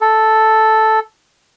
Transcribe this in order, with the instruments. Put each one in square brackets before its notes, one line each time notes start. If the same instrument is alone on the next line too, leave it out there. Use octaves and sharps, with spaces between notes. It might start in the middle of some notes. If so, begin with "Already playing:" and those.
[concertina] A4